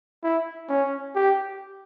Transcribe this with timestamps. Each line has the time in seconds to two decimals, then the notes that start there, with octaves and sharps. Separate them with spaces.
0.24 E4
0.69 C#4
1.15 G4